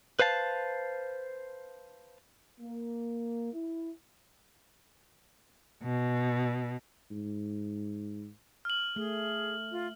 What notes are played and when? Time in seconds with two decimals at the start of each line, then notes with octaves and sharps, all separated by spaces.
0.19 B4 C5 F5 A5
2.61 A#3
3.54 E4
5.83 B2
7.11 G#2
8.65 F6 F#7
8.96 A3 G#4
9.72 F4